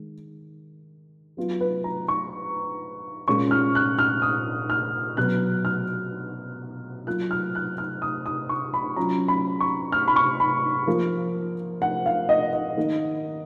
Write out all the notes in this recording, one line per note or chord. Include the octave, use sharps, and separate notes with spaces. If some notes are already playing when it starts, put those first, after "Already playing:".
Already playing: D#3 G#3
F#3 B3 F4
B4
A#5
C#6
A#2 G#3 C#4 F4 C#6
F6
F#6
F6
D#6
F6
B2 F#3 B3 F#6
F6
F#3 A#3 F4 F#6
F6
F#6
F6
D#6
D#6
C#6
B5
F#3 C#4 F4 A#5
B5
C#6
F6
B5
C#6
B5
F3 A#3 F4
F#5
F5
D#5
D#5
D#3 A#3 D#4